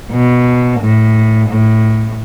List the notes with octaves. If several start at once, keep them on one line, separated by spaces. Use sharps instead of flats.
B2
A2
A2